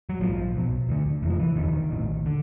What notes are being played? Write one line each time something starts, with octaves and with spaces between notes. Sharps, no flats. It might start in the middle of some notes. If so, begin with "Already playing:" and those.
F#3
A#1 G#2 F3
B1 B2
D2 D3
F1 F2 C3 E3
F3
E3
F1 D#2 D3 D#3
A#1 A2
D3